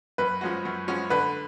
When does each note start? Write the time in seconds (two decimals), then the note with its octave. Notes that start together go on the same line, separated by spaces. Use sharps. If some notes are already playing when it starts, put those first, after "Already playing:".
0.18 F#2 B4
0.41 F3 G#3 C#4 F#4
0.65 F#2
0.88 F3 G#3 C#4 F#4
1.10 D3 B4